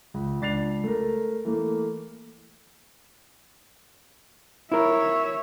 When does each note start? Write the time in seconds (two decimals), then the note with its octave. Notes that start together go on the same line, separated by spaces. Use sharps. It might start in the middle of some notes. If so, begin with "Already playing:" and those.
0.14 C#2
0.41 C#2 D4 A6 C7 F7
0.84 A3 A#4
1.45 E3 A3 A#3
4.72 E4 A#4 C#5 E5